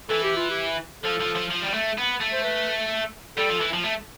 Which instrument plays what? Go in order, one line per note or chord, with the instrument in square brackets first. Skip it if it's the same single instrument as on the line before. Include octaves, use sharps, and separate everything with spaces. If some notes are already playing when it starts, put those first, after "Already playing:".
[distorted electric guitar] E3 [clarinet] A4
[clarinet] G4
F4
G4
[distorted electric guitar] F3 [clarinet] A4
[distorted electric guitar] F3
F3
F3
G3
A3
B3
A3
[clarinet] C5
B4
[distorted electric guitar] G3 [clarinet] A4
[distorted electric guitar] F3
E3
F3
A3